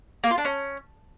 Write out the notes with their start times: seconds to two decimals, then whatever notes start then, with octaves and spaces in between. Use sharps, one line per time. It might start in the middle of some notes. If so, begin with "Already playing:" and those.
0.24 A#3
0.31 F4
0.38 D4
0.45 C#4